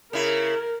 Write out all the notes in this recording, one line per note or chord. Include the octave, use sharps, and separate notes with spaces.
C#3 E4 A#4